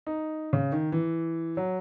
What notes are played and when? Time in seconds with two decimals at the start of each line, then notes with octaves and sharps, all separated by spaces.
0.07 D#4
0.53 C#3
0.72 D#3
0.92 E3
1.57 F#3